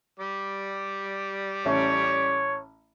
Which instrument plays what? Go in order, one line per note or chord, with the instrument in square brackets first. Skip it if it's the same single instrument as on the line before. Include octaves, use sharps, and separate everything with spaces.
[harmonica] G3 D6
[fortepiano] A1 A3 C#4 [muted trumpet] C#5